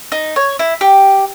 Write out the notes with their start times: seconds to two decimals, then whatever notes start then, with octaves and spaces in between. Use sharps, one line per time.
0.12 D#4
0.36 C#5
0.59 E4
0.81 G4